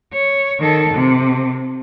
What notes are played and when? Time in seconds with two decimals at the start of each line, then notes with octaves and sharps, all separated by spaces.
0.13 C#5
0.60 D#3 A4
0.94 C3